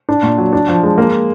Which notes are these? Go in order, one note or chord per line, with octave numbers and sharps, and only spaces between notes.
D4
A#2
F#3
D4
F3
G#3
A#3